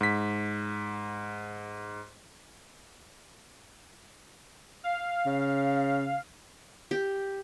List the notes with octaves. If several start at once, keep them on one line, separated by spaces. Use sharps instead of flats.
G#2 B6
F5
C#3
G4